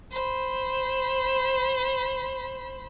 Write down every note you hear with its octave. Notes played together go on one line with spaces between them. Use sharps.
C5 B5